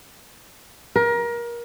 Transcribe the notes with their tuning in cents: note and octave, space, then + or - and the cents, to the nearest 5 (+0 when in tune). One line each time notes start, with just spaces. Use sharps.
A#4 +25